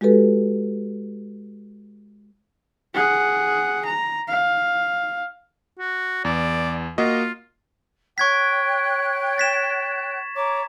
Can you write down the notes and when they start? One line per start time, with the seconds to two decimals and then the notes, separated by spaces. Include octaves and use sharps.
0.01 G#3 F#4 G4 A4 B4
2.94 G#4 F#5
3.86 A#5
4.28 F5
5.79 F#4
6.25 E2 D5
6.98 A#3 F4 F#4 D#5
8.18 C#5 G5 C#6 F#6 G#6 B6
9.38 A6 B6 E7
10.34 C#5 A#5 D6